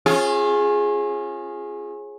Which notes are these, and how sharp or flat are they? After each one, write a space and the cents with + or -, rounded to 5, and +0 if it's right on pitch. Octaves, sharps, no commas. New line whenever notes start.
C#4 -40 F4 +0 G#4 +0